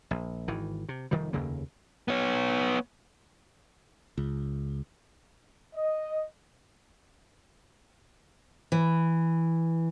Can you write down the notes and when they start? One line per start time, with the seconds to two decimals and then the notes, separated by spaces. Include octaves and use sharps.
0.11 A#1
0.48 G#1 D#3 E3
0.89 C3
1.11 F1 D#3 F3 G3
1.33 F1 D#2 C#3 A#3
2.08 B3 C#5
4.18 C#2
5.75 D#5
8.72 E3